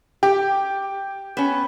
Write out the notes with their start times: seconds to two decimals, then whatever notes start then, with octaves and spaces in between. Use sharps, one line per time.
0.23 G4 G5
1.37 B3 C#4